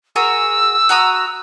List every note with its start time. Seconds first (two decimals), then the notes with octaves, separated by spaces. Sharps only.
0.16 F#4 G#4 A#4 E6
0.89 F#4 A#5 D#6